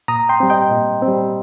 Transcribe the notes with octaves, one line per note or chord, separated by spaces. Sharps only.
A#2 A#5 D#6
G5 C6
G3 C4
D#5 G5
A#2
C4
G3